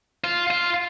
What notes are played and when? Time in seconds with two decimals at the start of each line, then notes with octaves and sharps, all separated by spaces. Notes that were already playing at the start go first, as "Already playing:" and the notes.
0.24 F4
0.51 F4